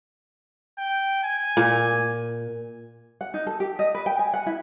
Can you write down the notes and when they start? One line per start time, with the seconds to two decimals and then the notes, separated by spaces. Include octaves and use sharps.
0.78 G5
1.24 G#5
1.57 A#2
3.21 F#5
3.34 D#4
3.47 A4
3.60 G4
3.79 D#5
3.95 B4
4.06 G5
4.19 G#5
4.34 F#5
4.46 E4